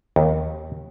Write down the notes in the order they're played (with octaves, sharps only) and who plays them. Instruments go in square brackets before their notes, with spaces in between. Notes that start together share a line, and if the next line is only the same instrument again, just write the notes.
[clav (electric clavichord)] D#2